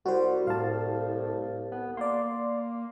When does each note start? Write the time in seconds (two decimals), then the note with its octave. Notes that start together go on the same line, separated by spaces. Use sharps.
0.06 C2 G3 F#4 C5
0.47 A2 F5 A5
1.72 B3
1.97 A#3 D5 C6